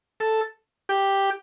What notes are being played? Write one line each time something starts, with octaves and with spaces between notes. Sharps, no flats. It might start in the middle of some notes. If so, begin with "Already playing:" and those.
A4
G4